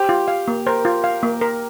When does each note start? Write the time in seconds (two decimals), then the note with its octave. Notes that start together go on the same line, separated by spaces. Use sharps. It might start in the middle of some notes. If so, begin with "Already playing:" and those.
Already playing: G4 C5
0.09 F4
0.28 F5
0.48 A#3
0.67 A#4 C5
0.85 F4
1.04 F5
1.23 A#3
1.41 A#4